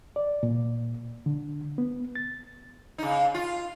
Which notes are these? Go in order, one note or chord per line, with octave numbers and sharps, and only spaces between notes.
D5
A#2
D3
B3
A6
C#3 D#4
F4